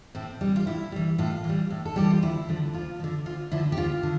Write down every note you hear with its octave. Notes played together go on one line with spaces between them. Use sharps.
A2 C4
E3 G3
F4
A2 E4
E3 G3
A2 F4
E3 G3
A2
A4
E3 G3 G4
F4
D2 E4
D3 F3
D2 F4
F3
D3
D2 F4
D3 F3 E4
G4
D2 F4
D3